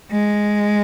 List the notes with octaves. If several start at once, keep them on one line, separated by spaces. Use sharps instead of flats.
G#3